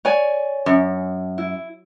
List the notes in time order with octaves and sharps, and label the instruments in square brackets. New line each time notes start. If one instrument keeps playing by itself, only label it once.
[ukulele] C#5 D5 G#5
[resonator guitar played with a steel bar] F#2
[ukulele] E4